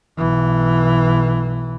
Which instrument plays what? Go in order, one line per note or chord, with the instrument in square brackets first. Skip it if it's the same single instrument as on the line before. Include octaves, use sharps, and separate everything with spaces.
[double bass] B1 E3